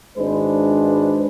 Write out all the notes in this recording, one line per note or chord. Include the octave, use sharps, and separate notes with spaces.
G#1 G#3 D4 B4 C5